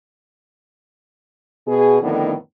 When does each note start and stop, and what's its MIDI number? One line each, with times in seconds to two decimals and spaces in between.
1.66 1.97 47
1.66 1.97 68
2.00 2.34 41
2.00 2.34 45
2.00 2.34 50
2.00 2.34 51
2.00 2.34 59
2.00 2.34 62